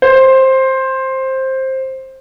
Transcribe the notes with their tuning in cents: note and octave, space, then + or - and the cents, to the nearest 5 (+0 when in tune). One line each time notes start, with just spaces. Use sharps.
C5 +10